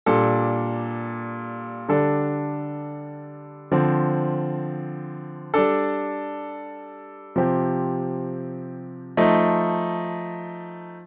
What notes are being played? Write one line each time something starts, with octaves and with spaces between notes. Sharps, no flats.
A#2 G3 D4 A4
D3 G3 D4 A4
D3 F3 C4
G3 D4 A4
C3 F3 C4 G4
F3 A3 D#4